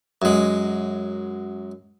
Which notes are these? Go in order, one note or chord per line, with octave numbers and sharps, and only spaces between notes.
F#2 G#3